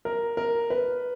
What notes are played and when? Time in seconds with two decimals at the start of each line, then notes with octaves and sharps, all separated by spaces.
0.05 A#4
0.37 A#4
0.70 B4